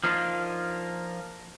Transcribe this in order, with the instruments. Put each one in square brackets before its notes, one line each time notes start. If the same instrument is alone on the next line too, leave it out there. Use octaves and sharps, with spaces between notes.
[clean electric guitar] F3 A#3 D4 D#4 F4